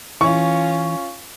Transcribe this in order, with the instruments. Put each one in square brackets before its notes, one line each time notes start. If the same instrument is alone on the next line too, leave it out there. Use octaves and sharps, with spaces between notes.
[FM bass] E3 [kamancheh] C#4 F4 [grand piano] C#6